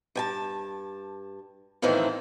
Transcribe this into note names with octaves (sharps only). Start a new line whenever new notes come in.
G2 G#5 A5
F2 A2 D#3 E3 C4